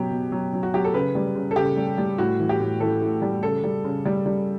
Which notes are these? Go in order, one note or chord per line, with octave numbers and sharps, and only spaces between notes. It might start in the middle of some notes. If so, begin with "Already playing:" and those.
Already playing: B2 F#3 G4
B2
F#3
F#3
F#4
F#3 G4
A4
C#3 B4
G3
C#3
A4
C#3 G4
G3
G3
A2 F#4
E3
G4
A2
E3 A4
A2
G3
C#3 A4
G3
C#3
G3
G3